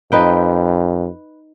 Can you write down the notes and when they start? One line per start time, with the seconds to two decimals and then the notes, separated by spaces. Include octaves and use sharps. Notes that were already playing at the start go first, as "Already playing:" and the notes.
0.12 F2 D#4 B4 G5